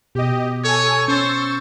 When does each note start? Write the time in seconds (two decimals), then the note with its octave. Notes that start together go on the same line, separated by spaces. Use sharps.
0.15 B2 G4 D#5
0.64 A4 C#5 G#5
1.08 C#4 C5 C#6 E6 A6